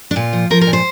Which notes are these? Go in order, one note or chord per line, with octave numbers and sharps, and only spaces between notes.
D4
A#2 F4
F3
F3 A#4
A#4
A#2
C5